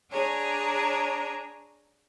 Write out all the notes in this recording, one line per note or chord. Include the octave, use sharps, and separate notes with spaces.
D4 G#4 C#5 A#5